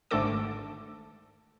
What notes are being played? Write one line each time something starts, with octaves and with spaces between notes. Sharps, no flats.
G#1 G#2 D3 A3 A4 D6